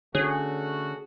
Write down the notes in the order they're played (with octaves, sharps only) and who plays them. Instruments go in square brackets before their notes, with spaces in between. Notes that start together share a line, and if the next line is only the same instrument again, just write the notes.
[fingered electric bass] D3 C#4 [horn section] A3 F#4 [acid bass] G#4 [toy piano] C#5